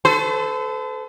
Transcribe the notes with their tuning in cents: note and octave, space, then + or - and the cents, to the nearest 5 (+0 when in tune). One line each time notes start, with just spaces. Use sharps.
A4 -10 C5 -45